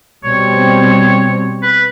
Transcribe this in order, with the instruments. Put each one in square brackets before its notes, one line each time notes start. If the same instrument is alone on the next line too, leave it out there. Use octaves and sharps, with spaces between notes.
[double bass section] B2 G3 C4 [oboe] C#5
[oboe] B4